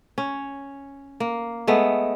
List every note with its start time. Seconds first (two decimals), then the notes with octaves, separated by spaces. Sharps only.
0.18 C#4
1.20 A#3
1.67 G#3 A3 B3